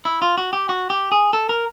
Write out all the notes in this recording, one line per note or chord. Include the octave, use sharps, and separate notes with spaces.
E4
F4
F#4
G4
F#4
G4
G#4
A4
A#4